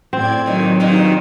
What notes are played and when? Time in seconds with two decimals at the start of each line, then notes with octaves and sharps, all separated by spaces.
0.13 A2 C4 D5 G#6
0.46 A#2 D#3 F#3
0.80 G2 A#2 D#3